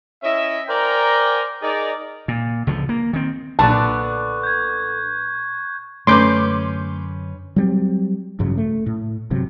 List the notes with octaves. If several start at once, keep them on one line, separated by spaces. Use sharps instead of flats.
C#4 E4 D#5 E5
A#4 C5 D5 G5 G#5 A#5
D#4 G#4 A#4 D5
A#2
C#2 D3 F3
A#3
D#3 C4
B1 A#2 D3 B3 D4 A5 C#6 F#6
G6 G#6
F#2 D3 A3 C#4 B4 C6 D6 G6
F#3 G3 C4
A1 G2 C#3 F#3
A3
A2
G1 C3 F#3